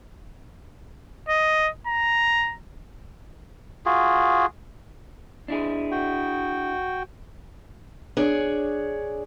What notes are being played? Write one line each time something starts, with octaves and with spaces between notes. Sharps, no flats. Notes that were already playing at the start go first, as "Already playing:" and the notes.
D#5
A#5
F4 F#4 G#4
D4 E4 G#4
F#4 G5
D4 G#4 C#5